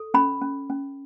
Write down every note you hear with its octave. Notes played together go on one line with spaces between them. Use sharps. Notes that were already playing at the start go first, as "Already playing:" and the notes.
Already playing: A4
C#4 B5
C#4
C#4